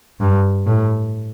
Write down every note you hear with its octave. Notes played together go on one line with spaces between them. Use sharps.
G2
A2